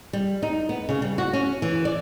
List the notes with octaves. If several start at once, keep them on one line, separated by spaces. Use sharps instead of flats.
G3
D#4
B3
C#3
G3
F#4
C#4
E3
D5